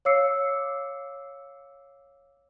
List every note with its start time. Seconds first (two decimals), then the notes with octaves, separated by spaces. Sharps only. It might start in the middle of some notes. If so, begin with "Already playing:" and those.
0.05 C#5 F5 D6 E6 C7 C#7